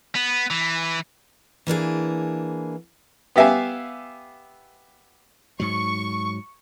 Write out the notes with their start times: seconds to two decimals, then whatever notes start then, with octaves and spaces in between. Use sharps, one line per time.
0.15 B3
0.50 E3
1.67 E3 A#3 D4 G#4
3.36 B3 G4 E5 F5 G#5
5.60 G#2 F#3 C#6